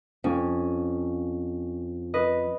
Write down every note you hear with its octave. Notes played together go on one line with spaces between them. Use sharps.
F2 C#4
B4 D#5